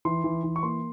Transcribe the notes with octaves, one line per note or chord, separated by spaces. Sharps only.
E3 C6
E3
E3
C#6
A#3 C6